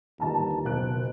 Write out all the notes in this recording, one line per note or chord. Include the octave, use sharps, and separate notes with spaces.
G1 D#2 A5 A#5
F#1 B2 F#6 D7